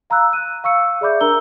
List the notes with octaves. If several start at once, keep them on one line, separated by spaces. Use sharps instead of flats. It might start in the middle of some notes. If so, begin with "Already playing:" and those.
F5 A#5 B5 E6 F#6
F#6 D#7
F5 C#6 E6 C#7
G#4 D5 E5 B5 D6 G6
D4 A#4 A#5 E6 G7